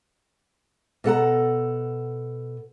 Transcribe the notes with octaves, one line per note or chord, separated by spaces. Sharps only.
B2 A4 F#5 A#5